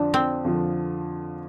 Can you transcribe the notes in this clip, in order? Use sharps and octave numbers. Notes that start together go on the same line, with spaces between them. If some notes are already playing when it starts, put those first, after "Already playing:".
Already playing: F2 D3 F3 D4
C4
F2 D3 F3